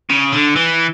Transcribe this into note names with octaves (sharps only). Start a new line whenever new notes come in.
C#3
D3
E3